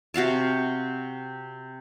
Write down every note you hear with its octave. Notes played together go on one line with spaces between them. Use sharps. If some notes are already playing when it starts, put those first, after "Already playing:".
C3 F#4 F5 A5